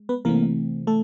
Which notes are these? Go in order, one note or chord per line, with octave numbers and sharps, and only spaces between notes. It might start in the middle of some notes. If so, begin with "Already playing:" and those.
Already playing: G#3
B3 B4
C3 E3 A3 A#3 C4 A#4
A3 A4